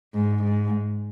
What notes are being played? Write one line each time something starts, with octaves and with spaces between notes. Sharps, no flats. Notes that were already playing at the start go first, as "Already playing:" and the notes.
G#2
G#2